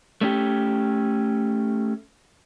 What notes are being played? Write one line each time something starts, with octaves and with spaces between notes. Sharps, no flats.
A3 C#4 G4